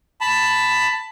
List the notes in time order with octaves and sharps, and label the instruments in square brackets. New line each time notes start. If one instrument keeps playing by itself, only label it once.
[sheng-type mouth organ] A5 B5